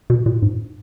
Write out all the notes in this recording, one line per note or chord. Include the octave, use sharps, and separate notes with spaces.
B2
A#2
G#2